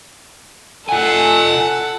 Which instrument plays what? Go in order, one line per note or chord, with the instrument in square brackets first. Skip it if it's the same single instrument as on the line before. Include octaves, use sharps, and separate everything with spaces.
[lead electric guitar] F4 G#5 [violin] A4 F#5